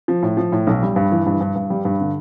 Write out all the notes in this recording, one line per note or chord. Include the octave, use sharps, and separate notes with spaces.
F3
A2
F3
A2
B1
G3
G2
E3
G2
G2
G2
G3
G2
D3